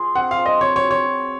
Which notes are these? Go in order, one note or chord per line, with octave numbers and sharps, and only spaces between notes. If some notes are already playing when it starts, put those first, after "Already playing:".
Already playing: F3 F4 G#4
C4 F#5
F5
F3
D#5
C4 C#5
C#5
F#4
C#5
F#3